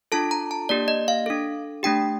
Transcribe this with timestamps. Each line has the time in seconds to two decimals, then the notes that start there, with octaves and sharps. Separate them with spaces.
0.12 D4 F4 A4 A5
0.31 A#5
0.51 A5
0.69 A#3 D4 G4 D5
0.88 D#5
1.08 F5
1.26 D4 A4
1.83 A3 D4 G4 G5